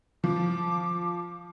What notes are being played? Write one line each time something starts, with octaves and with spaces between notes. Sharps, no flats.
F3 D6